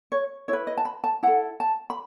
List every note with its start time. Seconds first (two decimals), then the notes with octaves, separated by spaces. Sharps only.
0.12 C#5
0.48 E4 B4 C#5
0.67 D#5
0.78 A5
0.85 B5
1.04 A5
1.23 E4 A4 F#5
1.60 A5
1.90 B5